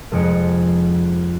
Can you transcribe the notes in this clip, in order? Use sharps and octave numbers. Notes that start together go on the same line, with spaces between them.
F1 F2 G#3 C#7 D7